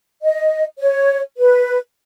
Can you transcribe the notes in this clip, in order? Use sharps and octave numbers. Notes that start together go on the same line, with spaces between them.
D#5
C#5
B4